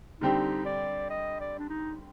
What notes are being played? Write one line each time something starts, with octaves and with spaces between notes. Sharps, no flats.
D3 G3 C4 D#4 G4
D5
D#5
D5
D4
D#4